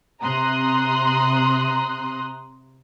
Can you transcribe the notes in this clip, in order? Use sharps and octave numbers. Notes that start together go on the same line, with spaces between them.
C3 A#5 C6 D#6 F#6